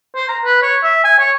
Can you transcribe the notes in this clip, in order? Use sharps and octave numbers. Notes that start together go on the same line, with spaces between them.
C5
A#5
B4
C#5
E5
G#5
C#5